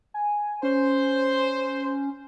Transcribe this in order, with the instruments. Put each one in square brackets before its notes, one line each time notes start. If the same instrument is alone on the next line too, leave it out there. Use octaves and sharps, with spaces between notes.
[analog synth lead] G#5
[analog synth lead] C#4 [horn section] C5